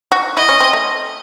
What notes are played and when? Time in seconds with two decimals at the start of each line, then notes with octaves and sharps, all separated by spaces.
0.12 F#4
0.37 E4 D#5
0.49 C#4
0.60 C4
0.73 A3